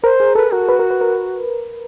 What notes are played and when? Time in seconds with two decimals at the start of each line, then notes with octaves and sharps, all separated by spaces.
0.03 A#4 C5
0.20 G#4
0.35 A4 B4
0.52 F#4 A#4
0.69 B4
0.79 A#4
0.90 B4
1.01 A#4